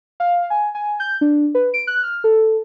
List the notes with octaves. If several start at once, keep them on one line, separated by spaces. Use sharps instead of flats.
F5
G#5
G#5
G6
D4
B4
D7
F#6
F6
A4